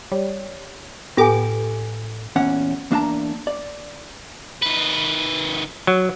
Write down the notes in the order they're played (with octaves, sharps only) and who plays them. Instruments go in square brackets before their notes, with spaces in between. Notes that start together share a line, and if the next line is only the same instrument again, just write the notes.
[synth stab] G3 [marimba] C#5
[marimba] A2 [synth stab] B3 G4 D6 [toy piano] F4 A4 G#5
[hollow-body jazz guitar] E2 A#2 C#4 F#5
E2 A#3 D4 F5 A5 A#5
D5
[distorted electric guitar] D#3 B4
[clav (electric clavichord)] F#3